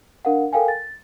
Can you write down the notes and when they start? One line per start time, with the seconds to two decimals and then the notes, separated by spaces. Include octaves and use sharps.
0.25 D4 A#4 F5 F#5
0.53 A4 A#4 F5 G5 G#5
0.68 A6